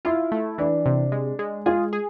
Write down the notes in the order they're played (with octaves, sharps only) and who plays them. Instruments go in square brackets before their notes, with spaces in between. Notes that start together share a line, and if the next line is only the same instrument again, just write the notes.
[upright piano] E4 [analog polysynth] F4
[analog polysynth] A3
[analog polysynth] E3 [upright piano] D4
[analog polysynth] C3
G#3
G#3
[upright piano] F4 [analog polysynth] G#4
[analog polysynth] G#4